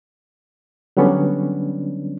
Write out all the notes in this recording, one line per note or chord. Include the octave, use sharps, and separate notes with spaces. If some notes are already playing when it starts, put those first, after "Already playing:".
D3 F#3 G3 B3 C#4 D4